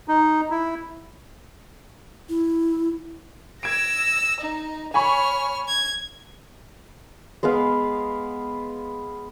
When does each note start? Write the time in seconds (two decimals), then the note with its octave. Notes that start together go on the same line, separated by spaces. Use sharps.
0.08 D#4
0.51 E4
2.29 E4
3.63 E6 G#6 A#6 D7
4.41 D#4
4.94 C#5 G#5 B5 C#6 F6
5.68 G#6
7.43 G#3 B3 B4 F5